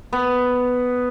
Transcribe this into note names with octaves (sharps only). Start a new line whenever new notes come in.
B3